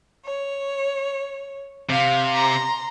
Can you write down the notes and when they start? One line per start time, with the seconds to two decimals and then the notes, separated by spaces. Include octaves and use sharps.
0.23 C#5
1.90 C3 F5
2.36 A#5 C6